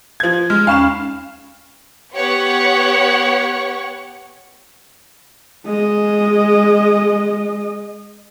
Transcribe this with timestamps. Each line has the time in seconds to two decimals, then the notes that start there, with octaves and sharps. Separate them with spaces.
0.20 F3 G#6
0.50 G#3 F6
0.67 D#2 C#4 F5 B5 E7
2.14 B3 G4 C#5 F#5 C#6
5.65 G#3 D#5